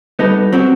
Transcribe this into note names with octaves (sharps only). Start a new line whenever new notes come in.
G3 B3 D#4 A4
F#3 C4 F#4